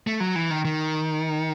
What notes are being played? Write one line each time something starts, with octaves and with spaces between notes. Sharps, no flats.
A3
F#3
E3
D#3
D#3